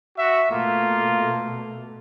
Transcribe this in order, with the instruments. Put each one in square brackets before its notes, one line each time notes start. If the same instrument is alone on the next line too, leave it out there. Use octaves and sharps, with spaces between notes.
[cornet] F#4 [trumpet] E5
[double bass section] B2 A3 [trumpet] A#3 [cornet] F4